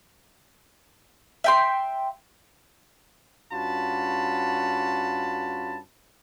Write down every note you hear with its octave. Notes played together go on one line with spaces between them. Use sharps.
E5 G5 C6
G2 C#4 F4 F#4 A5 B5